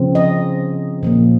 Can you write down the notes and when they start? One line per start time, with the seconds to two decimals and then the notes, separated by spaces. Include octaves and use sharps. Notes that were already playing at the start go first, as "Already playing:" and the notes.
Already playing: C#3 F3 C4
0.15 D#5
1.03 A#2 F3 A#3